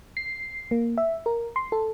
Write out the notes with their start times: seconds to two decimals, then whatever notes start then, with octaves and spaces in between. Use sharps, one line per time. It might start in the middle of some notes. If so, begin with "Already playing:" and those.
0.17 C7
0.71 A#3
0.98 E5
1.26 A#4
1.56 C6
1.72 A4